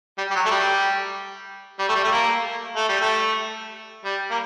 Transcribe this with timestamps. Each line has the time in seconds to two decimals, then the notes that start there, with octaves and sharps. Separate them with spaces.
0.18 G3
0.31 G3
0.35 F#3
0.45 A3
0.50 G3
1.79 G3
1.88 A3
1.95 G3
2.04 A3
2.11 A#3
2.76 A3
2.89 G3
3.01 A3
4.05 G3
4.31 A#3